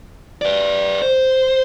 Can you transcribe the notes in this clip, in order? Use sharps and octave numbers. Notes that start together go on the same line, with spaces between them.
B4 D5
C5